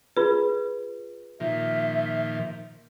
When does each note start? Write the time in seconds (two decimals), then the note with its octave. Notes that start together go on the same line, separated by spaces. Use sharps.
0.17 F4 G#4 B4
1.40 A#2 D#3 F3 E5